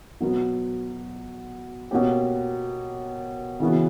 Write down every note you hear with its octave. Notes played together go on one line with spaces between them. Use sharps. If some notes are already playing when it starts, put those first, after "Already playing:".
B2 F#3 B3
B2 A#3 C#4 G4
C#3 E3 B3 F#4